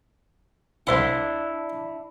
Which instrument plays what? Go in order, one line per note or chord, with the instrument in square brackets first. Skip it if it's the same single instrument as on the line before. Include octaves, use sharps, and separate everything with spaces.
[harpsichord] C2 C5 F#5 [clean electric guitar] D4 E4